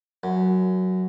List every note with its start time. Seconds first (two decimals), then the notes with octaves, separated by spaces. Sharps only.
0.24 F#2